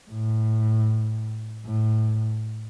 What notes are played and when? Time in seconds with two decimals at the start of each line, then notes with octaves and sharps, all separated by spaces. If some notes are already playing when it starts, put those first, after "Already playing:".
0.11 A2
1.66 A2